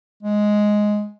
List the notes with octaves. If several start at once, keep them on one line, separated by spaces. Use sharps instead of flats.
G#3